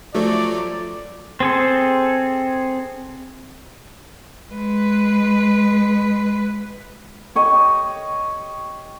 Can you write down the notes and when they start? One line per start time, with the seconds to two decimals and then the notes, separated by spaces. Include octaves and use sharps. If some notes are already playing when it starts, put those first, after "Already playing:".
0.15 F3 F#3 A3 D5
1.40 C4 G#4 A4
4.51 G#3 B4
7.35 G4 C#5 D#5